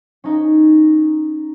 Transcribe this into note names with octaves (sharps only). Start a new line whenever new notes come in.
C#4 D#4